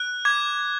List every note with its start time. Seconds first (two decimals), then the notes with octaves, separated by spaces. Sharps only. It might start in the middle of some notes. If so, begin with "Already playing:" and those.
Already playing: F#6
0.25 D6 G#6